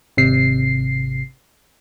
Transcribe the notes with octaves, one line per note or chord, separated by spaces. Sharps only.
G#1 C3 C7